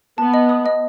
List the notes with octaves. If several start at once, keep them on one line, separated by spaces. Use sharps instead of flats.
B3 A5
D#5
D#6
D#5